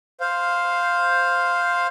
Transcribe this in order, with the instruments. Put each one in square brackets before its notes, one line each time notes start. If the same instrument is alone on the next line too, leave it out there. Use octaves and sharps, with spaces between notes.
[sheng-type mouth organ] C5 F5